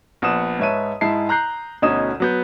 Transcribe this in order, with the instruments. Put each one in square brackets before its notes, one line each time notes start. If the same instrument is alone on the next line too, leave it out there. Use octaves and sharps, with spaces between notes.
[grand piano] A#1 B3 F#5 D#6 E7
G#2 B4 C#5 E5 A5 D#7
G#2 G#3 E4 A5 C7
A#5 F#6 G6 C7
D2 B2 C#4 D#4 D#6 E7
F#3 B3 G6